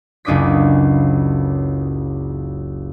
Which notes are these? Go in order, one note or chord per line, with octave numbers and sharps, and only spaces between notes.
F#1 C#2 D4 D#5 D6 B6